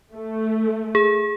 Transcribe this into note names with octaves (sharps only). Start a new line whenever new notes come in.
A3
G#4